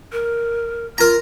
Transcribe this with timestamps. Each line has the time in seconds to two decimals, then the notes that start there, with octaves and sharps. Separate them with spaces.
0.12 A#4
0.98 F4 A#4 A#5